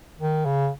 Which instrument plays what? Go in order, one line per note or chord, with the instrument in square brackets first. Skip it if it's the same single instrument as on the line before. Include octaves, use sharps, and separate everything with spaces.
[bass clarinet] D#3
C#3